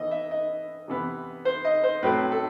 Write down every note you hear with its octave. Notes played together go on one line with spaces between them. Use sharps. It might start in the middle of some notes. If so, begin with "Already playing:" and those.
Already playing: E3 B3 D#5
E5
D#5
C3 E3 B3
C5
D#5
C5
A2 F#3 A3 C4 B4
A4